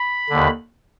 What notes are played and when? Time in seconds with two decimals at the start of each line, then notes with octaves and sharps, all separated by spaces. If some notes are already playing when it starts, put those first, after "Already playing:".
Already playing: B5
0.30 D#2 D3